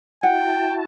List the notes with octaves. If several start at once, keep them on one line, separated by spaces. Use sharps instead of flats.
E4 F#4 F#5 G5 A5